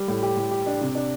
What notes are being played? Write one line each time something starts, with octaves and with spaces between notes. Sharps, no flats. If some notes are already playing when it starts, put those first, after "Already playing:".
Already playing: G3
A2
G4
A2
G4
D4
C3
D4